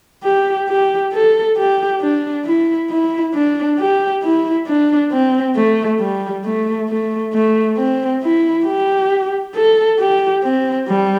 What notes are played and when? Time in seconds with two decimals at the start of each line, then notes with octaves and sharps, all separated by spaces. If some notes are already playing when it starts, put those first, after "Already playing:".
0.24 G4
0.68 G4
1.13 A4
1.57 G4
2.01 D4
2.45 E4
2.91 E4
3.34 D4
3.79 G4
4.23 E4
4.67 D4
5.12 C4
5.56 A3
6.00 G3
6.45 A3
6.89 A3
7.33 A3
7.77 C4
8.23 E4
8.66 G4
9.55 A4
10.00 G4
10.44 C4
10.88 G3